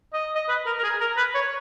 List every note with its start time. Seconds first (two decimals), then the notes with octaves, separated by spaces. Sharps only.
0.13 D#5
0.35 D#5
0.49 B4
0.66 A#4
0.79 A#4
0.84 G#4
1.01 A#4
1.17 B4
1.35 C#5